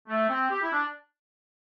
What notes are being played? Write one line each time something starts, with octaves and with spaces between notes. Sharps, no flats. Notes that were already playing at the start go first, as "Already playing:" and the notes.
A3
C4
G4
E4
D4